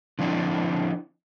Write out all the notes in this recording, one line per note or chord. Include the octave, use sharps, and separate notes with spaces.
D3 F3 C4 D4 E4